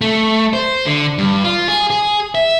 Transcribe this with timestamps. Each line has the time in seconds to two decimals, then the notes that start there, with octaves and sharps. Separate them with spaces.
0.01 A3
0.53 C5
0.86 D3
1.18 G2
1.44 F4
1.68 G#4
1.90 G#4
2.35 E5